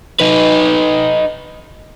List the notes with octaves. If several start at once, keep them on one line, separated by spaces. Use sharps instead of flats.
D#4 B4